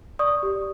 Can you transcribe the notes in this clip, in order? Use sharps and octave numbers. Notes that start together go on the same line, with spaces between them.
D5 C#6 D#6
G4